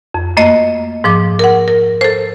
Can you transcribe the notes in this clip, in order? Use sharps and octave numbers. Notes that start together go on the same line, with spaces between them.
F2
F#2 A3 A#3 D#5
G#2 F3 D6
A#4 F#5
A#4
A4 C5